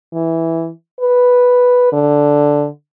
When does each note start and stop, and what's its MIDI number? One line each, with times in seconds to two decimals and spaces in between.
0.13 0.70 52
1.00 1.88 71
1.92 2.67 50